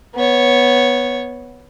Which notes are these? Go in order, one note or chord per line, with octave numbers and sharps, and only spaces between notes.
B3 C#5